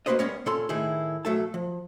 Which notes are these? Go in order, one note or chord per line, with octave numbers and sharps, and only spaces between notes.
A#3 C#4 F#4 B4 C5 D#5
G3 B3 C#4 A#4 C#5
A#2 C#4 A4 B5 C6
A2 D#3 D#4 E4 G#4
B1 F#3 A3 A4 A5
F3